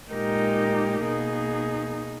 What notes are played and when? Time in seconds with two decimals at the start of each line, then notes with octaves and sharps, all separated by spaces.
0.11 A#2 G#3 D#4 G4 A#4
1.04 B2 A#3 D#4 G#4